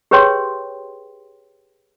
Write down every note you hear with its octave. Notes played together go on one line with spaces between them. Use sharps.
G4 G#4 B4 C#5 G5 C6